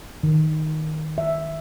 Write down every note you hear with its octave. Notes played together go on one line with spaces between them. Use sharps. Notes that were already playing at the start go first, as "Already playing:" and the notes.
D#3
E5